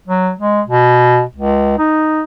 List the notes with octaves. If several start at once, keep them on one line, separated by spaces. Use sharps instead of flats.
F#3
G#3
B2
C#2
D#4